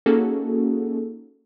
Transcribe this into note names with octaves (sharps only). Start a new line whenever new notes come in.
A#3 C#4 D#4 F#4 G#4 A4